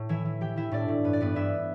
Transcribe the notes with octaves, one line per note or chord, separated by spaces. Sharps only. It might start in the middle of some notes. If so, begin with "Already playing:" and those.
Already playing: A2
E3 E4 E5
E3
E3 G4 G5
E3 E4 E5
A2 D4 D5
A2
G2 B4
D5
G2 B3 B4
G2 E4 E5